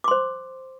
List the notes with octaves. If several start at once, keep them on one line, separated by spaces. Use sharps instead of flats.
C5 C6 D6